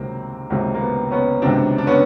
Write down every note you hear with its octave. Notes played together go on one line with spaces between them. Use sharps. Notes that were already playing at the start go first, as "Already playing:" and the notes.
Already playing: C#2 C3 D#3 F#3 A#3 C4
C#2 C3 D#3 F#3 A#3 C4
A#3
B3
B3 C#4
C#2 C3 D#3 F#3 C4 D4
D4
B3 C#4